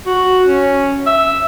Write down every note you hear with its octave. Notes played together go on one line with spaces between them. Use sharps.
F#4
C#4
E5